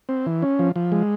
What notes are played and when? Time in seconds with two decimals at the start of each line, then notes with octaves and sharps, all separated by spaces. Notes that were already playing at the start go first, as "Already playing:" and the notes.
0.09 C4
0.26 E3
0.42 C#4
0.59 F3
0.76 F3
0.92 G#3